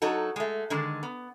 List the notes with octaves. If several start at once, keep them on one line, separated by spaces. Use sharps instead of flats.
F#3 D#4 F#4 A4
G#3 A3
D3 D#3 G#3
B3